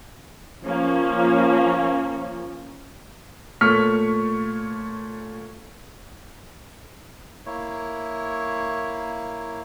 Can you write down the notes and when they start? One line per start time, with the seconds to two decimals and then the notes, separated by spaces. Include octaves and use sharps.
0.65 F3 A#3 C#4
3.61 A#2 A3 C#5 C#6 F6 B6
7.46 A#3 E4 C#5